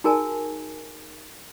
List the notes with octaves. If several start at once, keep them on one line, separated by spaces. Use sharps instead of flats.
D#4 F#4 G#4 A#4 G#5 A5